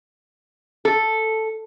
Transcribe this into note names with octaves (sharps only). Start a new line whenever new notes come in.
A4